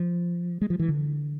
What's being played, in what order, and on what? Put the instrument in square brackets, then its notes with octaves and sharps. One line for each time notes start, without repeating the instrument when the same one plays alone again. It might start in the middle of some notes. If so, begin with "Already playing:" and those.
Already playing: [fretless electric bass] F3
G#3
F3
E3
D3